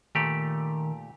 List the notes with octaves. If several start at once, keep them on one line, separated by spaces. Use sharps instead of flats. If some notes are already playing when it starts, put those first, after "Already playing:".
A#2 D#3 A3 G4